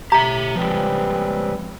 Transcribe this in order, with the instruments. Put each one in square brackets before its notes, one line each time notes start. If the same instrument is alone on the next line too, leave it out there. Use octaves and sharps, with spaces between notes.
[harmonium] A2 [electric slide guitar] G4 E5 [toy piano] A#5
[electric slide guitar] F3 G#3 [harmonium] G3 C4 B4